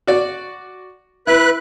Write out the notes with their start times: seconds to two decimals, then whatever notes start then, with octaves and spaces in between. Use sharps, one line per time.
0.07 F#4 D5
1.27 E4 B4 F#6